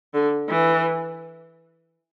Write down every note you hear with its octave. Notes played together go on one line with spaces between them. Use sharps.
D3
E3